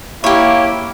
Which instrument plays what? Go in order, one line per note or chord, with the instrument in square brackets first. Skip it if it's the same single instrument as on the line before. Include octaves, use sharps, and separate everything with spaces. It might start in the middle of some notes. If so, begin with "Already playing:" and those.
[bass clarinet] A#3 [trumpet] E4 [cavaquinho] G4 C#5